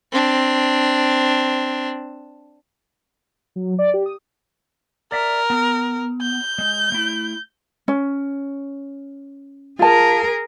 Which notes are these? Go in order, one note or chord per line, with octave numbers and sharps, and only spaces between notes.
C4 D4
F#3
D5
G4
D#6
A#4 D5 E5
B3
G6
G#3
A3 E4
C#4
F4 G#4 A#4 A5